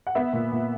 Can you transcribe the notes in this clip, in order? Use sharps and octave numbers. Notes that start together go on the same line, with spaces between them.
F#5
B3 E5
A#2
A#2